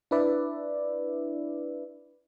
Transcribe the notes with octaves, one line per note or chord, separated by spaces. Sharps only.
D4 E4 B4 D5 E5